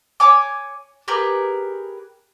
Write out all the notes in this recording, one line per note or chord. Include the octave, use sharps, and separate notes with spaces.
C#5 G#5 D6
G4 G#4 A#4 B4